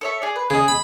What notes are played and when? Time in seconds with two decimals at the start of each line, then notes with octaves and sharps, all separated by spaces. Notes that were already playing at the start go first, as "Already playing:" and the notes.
0.01 A4 C#5 E5
0.22 G#4 D5
0.36 B4
0.50 C#3 G#4 D#5
0.68 B5